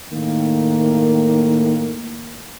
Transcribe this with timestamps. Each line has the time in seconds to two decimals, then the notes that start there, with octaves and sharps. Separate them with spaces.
0.13 A2 D#3 A#3